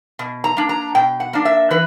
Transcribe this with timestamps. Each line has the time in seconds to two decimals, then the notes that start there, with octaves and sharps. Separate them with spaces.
0.19 B2
0.44 A#5
0.57 A#3 D4
0.69 A#5
0.95 B2 G5
1.20 F#5
1.33 A#3 D4
1.45 E5
1.71 E3 B4